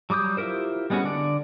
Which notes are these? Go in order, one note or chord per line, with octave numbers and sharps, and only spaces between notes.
F#3 G3 D6 D#6 G6
E4 F4 G4 A#4 C5
G3 G#3 B3 C#4 F#4
D3 D5